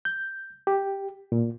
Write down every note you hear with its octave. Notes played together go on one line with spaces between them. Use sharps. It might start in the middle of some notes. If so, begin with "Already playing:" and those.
G6
G4
A#2